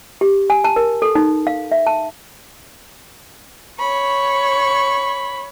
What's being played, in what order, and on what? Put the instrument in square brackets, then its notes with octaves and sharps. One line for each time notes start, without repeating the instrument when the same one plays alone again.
[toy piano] G4
G#5
A5
A#4
A4
D#4
F5
E5
A5
[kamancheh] C#5 C#6 [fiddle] B5